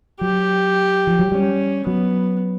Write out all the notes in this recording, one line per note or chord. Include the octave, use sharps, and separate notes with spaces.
F#3 G4
F3
F#3
G3 C#4
F#3 B3